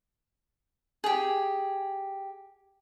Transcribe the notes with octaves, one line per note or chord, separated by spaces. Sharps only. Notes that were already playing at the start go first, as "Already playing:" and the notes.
G4 G#4